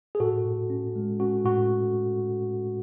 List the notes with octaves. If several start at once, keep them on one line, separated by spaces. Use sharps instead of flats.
G#4
A2 F#4 A4
A2
C#4
G#3
C#4 F#4
A2 F#4